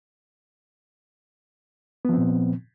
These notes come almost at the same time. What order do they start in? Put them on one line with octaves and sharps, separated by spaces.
B3 F3 C4 A#2